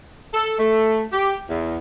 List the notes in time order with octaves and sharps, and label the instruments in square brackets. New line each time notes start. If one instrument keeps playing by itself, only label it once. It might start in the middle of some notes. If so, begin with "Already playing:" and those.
[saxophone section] A4
A3
G4
E2